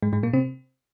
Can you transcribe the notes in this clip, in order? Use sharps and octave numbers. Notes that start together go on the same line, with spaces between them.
G#2 G#3
G#2 G#3
A#2 A#3
C3 C4